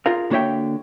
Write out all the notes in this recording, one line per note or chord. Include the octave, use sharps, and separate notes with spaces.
F4 G#4 A#4 F5
D3 A#3 F#4 C#5 E5 G5